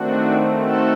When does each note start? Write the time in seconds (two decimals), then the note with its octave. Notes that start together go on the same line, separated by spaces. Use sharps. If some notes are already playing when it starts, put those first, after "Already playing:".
Already playing: D#3 A3 C4 D4 F#4
0.57 F#4 A4